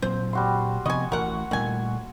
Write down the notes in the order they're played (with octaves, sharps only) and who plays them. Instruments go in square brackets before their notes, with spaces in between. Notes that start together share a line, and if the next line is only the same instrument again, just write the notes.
[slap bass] A#2 F#3 C4 [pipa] C5
[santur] G3 F#4 C6
[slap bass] C3 F3 B3 [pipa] D#5 G#5 [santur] C#6
[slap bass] A1 [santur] F#4 C#6 [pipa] A#4 F#5
[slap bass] A#2 G3 A3 [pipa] D#3 G#5